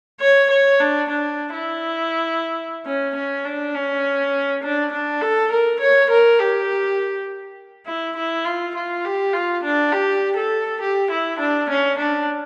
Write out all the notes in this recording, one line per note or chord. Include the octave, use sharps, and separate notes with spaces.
C#5
C#5
D4
D4
E4
C#4
C#4
D4
C#4
D4
D4
A4
A#4
C#5
A#4
G4
E4
E4
F4
F4
G4
F4
D4
G4
A4
G4
E4
D4
C#4
D4